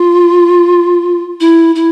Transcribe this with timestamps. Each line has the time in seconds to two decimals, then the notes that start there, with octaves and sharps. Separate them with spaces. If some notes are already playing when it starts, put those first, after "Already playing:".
Already playing: F4
1.40 E4
1.75 E4